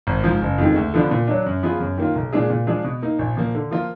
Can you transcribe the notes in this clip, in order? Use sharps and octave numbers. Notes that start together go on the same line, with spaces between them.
G#1
G#2 F3
F#1
F2 D#3 G#3
D2
D3 F3 B3 D4
A#2
F#3 D4
F#2
F3 B3 F4 G#4
F#2
D#3 A#3 F4
B1
A#2 G#3 D4 G#4
A#2
F3 G#3 D4 G#4
B2
A#3 D#4
A#1
A#2 F3 A#3
D3
F3 A#3 F4